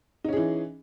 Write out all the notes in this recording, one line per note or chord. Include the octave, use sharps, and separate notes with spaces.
E3 C#4 D#4 G#4